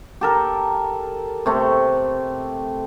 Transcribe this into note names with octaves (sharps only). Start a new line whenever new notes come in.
G4 A4 A#4
C3 A3